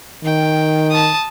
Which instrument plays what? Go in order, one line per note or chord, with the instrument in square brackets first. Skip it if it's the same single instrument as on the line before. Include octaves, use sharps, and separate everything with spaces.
[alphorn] D#3 [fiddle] G5
[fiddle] A5 D#6